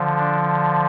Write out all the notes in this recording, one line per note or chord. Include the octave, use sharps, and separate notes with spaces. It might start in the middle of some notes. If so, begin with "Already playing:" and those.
Already playing: D3 F3
D4